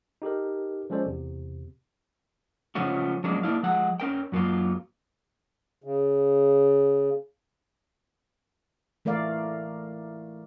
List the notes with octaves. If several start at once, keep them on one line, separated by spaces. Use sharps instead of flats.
D#4 G4 A4 A#4
F3 G#3 C#4 A4 C5 D5
E2 C3
C#3 F3 A3 C#4 F4 F#4
F3 F#3 G#3 A#3 C#4 D4
A#3 B3 D4 E4 F5
F3 G#3 F#5
C#4 A#4 G5
F#2 F#3 A#3 F4
C#3
E3 A3 A#4 D5 F5